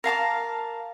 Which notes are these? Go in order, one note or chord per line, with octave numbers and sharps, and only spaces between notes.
A#4 F5 A5 D6